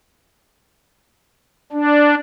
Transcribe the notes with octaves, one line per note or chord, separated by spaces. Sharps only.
D4